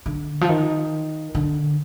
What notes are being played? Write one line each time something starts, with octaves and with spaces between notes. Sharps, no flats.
D3
F3
D#3
D3